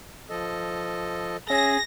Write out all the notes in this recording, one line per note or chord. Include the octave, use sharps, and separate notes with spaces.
F3 A4 D#5
C#4 G#4 E5 A#6